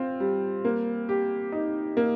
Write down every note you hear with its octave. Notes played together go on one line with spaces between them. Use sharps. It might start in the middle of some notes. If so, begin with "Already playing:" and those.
Already playing: C4 F4
G3
A#3
G4
D#4
A#3